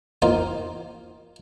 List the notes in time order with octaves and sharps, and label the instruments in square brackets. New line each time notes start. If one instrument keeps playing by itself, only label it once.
[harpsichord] A#3 D#4 F4 C5